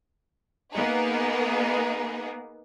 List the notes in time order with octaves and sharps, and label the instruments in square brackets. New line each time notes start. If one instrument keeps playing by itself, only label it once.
[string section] A#3 B3 D#4 G#4